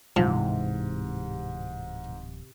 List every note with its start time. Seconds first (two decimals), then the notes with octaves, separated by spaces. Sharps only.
0.16 D1 G#2 C3 E3 F3